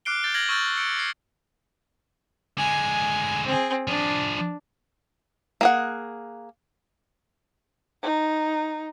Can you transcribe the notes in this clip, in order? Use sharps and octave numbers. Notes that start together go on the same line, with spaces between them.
D6 F6 F#6 C7 D7 G7
G6 A6 G7
F6 G#6 A#6 F#7
C#6 E6 F6 G6 A6
E6 C#7 D7
A#6 C7
D3 G#3 G#5
C4 G#4
F3 D4 G#4
A#3 G#4 F#5
D#4